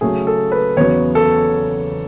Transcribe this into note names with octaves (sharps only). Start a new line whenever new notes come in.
C#3 F#3 A3 G#4
A4
B4
E2 C#3 F#3 B3 C#5
A4